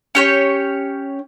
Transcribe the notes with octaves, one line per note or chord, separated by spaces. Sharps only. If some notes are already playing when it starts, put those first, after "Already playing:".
C#4 G4 C#5